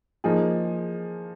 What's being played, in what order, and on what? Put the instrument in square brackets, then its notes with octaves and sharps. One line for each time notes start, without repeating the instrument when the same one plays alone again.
[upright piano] F3 A#3 D#4 G#4